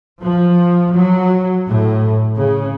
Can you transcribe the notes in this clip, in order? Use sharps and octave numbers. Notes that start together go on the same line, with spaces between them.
F3
F#3
A2
C#3